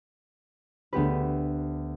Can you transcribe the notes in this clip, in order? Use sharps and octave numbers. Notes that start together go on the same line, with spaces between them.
D2 B3 G4 B4